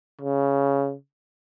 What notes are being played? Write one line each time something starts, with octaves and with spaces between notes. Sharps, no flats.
C#3